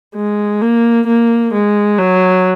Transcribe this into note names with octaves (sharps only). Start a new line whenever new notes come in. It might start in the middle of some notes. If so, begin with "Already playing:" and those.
G#3
A#3
A#3
G#3
F#3